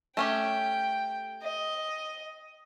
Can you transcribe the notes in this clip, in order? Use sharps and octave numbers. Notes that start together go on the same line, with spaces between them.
A3 C#4 G4 G5
D#5